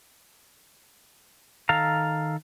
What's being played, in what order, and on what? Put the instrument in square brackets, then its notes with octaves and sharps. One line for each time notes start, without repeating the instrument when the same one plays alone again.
[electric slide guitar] D#3 A4 F5 A#5